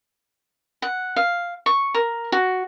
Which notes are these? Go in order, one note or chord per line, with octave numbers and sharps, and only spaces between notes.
F#5
F5
C#6
A#4
F#4